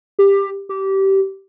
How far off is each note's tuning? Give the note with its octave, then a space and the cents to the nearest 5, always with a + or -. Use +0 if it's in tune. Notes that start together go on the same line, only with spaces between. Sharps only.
G4 +15
G4 -20